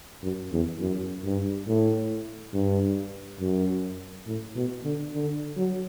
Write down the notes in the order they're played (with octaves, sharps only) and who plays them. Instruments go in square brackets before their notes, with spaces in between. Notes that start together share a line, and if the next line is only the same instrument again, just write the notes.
[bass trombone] F#2
E2
F#2
G2
A2
G2
F#2
A2
B2
D3
D3
F#3